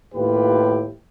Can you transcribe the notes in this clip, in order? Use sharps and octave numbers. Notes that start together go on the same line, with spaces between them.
D#2 A2 F4 G4 B4